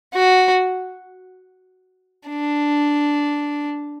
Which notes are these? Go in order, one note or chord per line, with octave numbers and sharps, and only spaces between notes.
F#4
D4